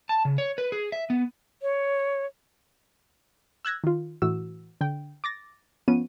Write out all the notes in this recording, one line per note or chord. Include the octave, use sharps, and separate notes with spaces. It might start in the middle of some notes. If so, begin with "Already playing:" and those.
A5
C#3
C#5
B4
G#4
E5
B3
C#5
E6 F#6 G#6 A#6
D#3 F4
A2 E3 F#4 E6
D3 G5
D6 A6 A#6
F3 B3 C#4 D#7